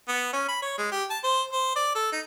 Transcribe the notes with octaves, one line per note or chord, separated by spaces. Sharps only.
B3
C#4
B5
C#5
G#3
G4
A5
C5
C5
D5
A4
D#4